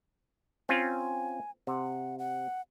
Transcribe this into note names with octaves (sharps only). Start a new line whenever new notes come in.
C4 C#4 F4 G#5
C3 F#5
F#5